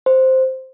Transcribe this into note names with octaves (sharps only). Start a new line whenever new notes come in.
C5